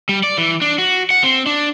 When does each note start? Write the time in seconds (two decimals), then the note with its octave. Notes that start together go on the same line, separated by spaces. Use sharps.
0.09 G3
0.24 D5
0.38 E3
0.61 D4
0.78 F#4
1.10 F#5
1.24 C4
1.46 D4